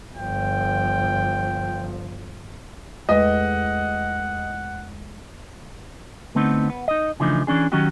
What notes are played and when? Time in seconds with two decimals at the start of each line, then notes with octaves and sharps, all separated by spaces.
0.17 G1 F3 G5
3.09 E2 G#3 A3 B4 D#5 F#5
6.35 D3 A3 B3 C4 D#4
6.70 B3
6.88 D#4 D#5
7.20 C#3 E3 F3 A3 D4 D#4
7.47 E3 C#4 D4 G#4
7.72 D#3 F#3 C#4 D#4 F#4 G4